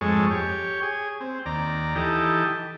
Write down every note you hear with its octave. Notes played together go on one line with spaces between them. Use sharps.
F2 G#2 G#3 A4 C#5
G4 C#5
G#4
C4
D#2 D5 A#5
E3 D#4 G4 A4